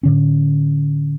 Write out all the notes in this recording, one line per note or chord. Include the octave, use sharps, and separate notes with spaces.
A2 D3 C#4